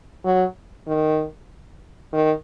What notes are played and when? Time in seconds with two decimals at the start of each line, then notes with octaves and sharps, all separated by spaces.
0.25 F#3
0.87 D#3
2.13 D#3